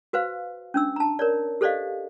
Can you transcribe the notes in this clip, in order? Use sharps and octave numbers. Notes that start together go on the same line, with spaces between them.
F#4 B4 C5 F5
C#4 D4 E6
A5 A#5
A#4 C#5 D5
G4 A4 C5 D5 D#5 F5